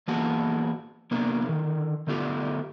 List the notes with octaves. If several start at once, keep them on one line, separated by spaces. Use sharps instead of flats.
E3 A#3 B3 F#4 G#4 A5
C3 A#3 B3 D4
D3 D#3
D3 A3 B3 F4 G4